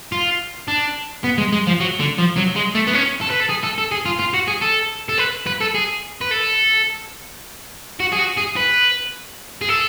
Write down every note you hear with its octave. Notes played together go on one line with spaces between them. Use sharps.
F4
D4
B3
G#3
G#3
F3
F#3
D3
F3
F#3
G#3
A3
B3
C#4
A4
B4
A4
G#4
A4
A4
G#4
F4
F4
F#4
G#4
A4
A4
B4
B4
A4
G#4
B4
A4
F#4
G#4
F#4
G#4
B4
G#4
A4